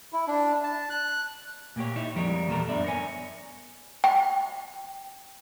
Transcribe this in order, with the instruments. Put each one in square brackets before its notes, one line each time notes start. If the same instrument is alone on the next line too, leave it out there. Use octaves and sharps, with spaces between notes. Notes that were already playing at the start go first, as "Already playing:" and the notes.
[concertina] E4
D4
A5
F#6
[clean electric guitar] A#2 A#3 G4 C#5
D#4 E4 C#5
F2 F3 G3 G#3 A#4 C#5
E2 A#2 G3 A4 A#4
F#2 B3 D4 D5 E5
A#4 C#5 G#5
[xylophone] G5